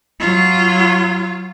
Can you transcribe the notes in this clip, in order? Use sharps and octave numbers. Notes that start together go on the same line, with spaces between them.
F#3 F4